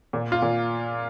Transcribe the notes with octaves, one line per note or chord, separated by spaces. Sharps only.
A#2
F4
A#2